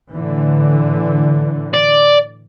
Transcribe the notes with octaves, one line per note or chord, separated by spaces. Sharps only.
A2 D3 E3
D5